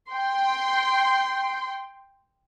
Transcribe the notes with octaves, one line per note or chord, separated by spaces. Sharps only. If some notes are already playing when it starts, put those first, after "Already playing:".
G5 C6